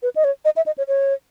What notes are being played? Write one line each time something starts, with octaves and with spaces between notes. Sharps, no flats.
B4
D#5
C#5
D#5
E5
D#5
C#5
C#5